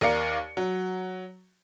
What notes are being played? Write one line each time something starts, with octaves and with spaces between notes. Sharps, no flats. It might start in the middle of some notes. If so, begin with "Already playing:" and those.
D#2 A#4 D5 F5 C#7
F#3